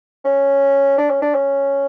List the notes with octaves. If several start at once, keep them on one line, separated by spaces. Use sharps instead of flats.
C#4
D4
C#4
D4
C#4